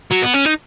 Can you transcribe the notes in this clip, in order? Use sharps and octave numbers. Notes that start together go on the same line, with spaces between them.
F#3
B3
C#4
D#4